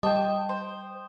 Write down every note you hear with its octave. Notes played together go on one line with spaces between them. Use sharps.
G3 F4 C5 D#5 G5 A5 D#6
C5